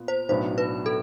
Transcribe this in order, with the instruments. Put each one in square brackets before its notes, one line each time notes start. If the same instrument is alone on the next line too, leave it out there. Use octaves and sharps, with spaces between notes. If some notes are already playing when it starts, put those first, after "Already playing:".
Already playing: [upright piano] A#2 B3
[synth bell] C5
[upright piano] B1 A2 F#3 B3 D4 [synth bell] C5
[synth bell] B4
A4